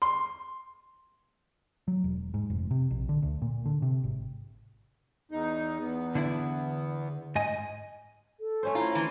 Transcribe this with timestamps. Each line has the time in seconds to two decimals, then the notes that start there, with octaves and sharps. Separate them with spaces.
0.02 C6
1.88 F#3
2.04 E1
2.34 G#2
2.50 F1
2.71 C3
2.91 A#1
3.09 D3
3.22 D2
3.42 A#2
3.66 D3
3.82 C3
4.04 G#1
5.31 E2 D#4
5.81 E2 B3
6.15 D3 D4 E4
7.35 G#2 D#5 G#5
8.40 A4
8.63 A3 C#4 C5
8.75 E4 F4 A#5
8.95 E3